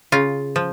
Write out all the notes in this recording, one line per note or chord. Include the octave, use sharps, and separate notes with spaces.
C#3 F4
F3